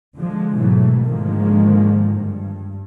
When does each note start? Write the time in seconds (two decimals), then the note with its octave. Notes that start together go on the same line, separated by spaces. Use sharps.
0.16 D3 F3 G#3
0.54 G#2 B2 E3 F#3 A3
1.05 G#2 D3 D#3 F3 G#3 A#3
2.17 G2